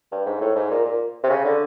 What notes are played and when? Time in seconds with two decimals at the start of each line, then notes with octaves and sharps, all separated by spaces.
0.12 G2
0.26 G#2
0.41 A2
0.56 G#2
0.71 A#2
0.85 A#2
1.24 C3
1.30 C#3
1.45 D3